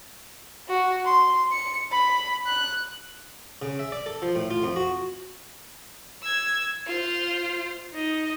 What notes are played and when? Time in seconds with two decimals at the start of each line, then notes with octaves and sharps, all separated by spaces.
0.68 F#4
1.05 C6
1.51 C#7
1.91 B5
2.46 F#6
3.62 C#3
3.79 E5
3.92 D5
4.06 A4
4.22 F3
4.35 A2
4.50 F4
4.63 F2
4.76 F#4
6.22 E6 G#6
6.87 F4 C5
7.94 D#4 D#5